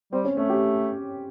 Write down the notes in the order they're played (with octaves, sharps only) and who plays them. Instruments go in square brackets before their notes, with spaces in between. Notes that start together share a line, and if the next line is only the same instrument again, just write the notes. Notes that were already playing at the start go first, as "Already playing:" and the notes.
[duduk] G3 [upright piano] C4
[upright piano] C#4
[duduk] A3
[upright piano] C#4
G4